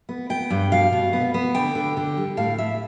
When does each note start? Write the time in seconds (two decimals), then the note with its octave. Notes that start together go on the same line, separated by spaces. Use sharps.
0.09 B3
0.30 B3 G5
0.50 G2
0.72 B2 F5
0.92 B2
1.13 B3
1.34 B3
1.55 D3 G5
1.75 D3
1.97 D3
2.17 G3
2.37 A2 F5
2.58 A2 E5